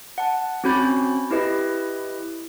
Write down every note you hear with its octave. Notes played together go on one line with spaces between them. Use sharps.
F#5 A5
C4 C#4 F#4 B5 G6 A6
E4 G4 B4 D#5